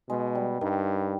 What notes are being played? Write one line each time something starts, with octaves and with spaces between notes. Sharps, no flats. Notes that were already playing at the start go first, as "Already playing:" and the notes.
B2 G#3
G3
G2 D#3